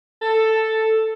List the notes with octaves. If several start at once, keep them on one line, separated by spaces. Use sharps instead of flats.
A4